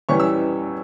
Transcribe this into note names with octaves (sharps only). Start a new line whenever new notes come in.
E2 E3 G3 C#4 C#6
E6